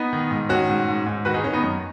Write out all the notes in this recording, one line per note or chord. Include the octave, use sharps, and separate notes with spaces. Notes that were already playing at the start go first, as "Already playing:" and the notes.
Already playing: B3 D#4
D#3
G#2
D#3 C#4 F#4
G#2
G#2
G#2
D#3 F#4 B4
D#4 G#4
D#3 C#4
B3 D#4
F#2